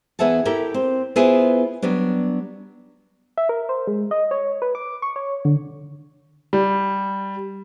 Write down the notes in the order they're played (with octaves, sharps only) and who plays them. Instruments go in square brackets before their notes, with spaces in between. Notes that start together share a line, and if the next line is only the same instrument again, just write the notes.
[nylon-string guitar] E2 B3 G#4 E5 F#5 A5
E4 G4 A4 A#4 G5
C4
B3 E4 F4 G#4 B4 C5
F#3 G3 B3 D4
[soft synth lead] E5
A#4
C5
G#3
D#5
C#5
B4
D6
C#6
C#5
D3
[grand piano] G3